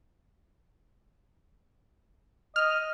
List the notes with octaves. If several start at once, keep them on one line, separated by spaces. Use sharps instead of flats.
D#5 F6